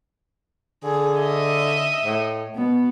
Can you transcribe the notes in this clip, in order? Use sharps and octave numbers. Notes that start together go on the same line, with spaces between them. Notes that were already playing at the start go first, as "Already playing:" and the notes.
D3 G#4
D#5 E5
A2
B2 B3